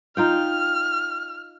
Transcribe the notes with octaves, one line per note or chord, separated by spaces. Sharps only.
D#4 F4 G5 F6